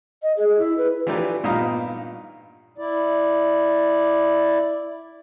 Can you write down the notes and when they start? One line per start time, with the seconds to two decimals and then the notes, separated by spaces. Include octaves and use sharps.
0.23 D#5
0.37 G#4
0.59 E4
0.78 B4
1.07 E3 F#3 D4 F4 G4 B4
1.44 G2 A#2 B3 D#4 F5 D#6
2.78 E4 D5